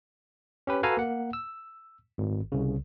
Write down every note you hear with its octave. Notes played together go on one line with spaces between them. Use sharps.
C#4 G4 B4
F#4 A4 B4 F5 G#5 A#5
A#3 F#5
E6
G#1
C2 C#3